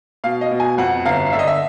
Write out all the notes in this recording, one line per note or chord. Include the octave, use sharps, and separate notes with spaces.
B2 F5
D#5
B2
G#5
F2 F#5
G1 F5
D3 E5
D#5
E5